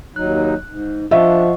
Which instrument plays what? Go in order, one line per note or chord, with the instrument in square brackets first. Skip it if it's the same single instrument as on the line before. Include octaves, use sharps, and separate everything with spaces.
[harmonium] D#2 F#3 D#4 [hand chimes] F#6
[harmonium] G#2
[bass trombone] F3 [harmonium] D4 [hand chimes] D#5 F#5 C#6 [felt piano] E5